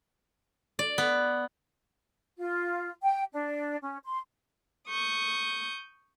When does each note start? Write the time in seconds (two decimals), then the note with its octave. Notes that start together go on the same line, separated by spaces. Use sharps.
0.79 D5
0.98 B3
2.38 F4
3.02 G5
3.32 D4
3.82 C#4
4.04 C6
4.88 C#6 D#6 G6